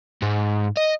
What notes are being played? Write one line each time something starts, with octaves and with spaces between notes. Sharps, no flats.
G#2
D#5